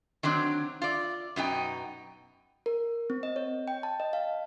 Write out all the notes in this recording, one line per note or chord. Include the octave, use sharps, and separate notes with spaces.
D#3 F#3 C4 D4
F4 D5
F#2 B2 D#4 G5
A#4
C4
D#5
C#5
G5
A5
D#5
F5